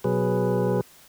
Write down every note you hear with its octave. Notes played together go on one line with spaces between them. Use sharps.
B2 F#3 G#4 B4